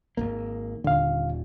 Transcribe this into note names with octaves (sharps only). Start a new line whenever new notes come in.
G#1 E2 A#3
D#1 D3 F5